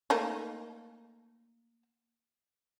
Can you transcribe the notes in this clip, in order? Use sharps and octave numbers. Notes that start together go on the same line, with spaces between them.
A3 A#3 D#4